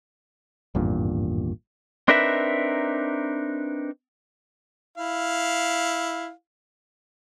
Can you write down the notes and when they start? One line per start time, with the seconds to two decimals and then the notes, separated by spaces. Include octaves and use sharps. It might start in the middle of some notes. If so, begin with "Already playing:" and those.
0.75 G#1 E2 G2 A#2
2.08 C4 D4 D#4 A#4 B4 E5
4.98 E4 F5